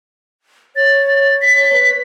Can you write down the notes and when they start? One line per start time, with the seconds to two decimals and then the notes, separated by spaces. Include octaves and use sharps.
0.76 C#5 A6
1.42 B6
1.73 B4